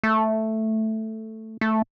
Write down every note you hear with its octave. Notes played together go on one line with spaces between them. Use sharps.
A3
A3